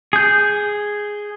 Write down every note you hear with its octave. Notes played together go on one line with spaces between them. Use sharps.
G#4 G6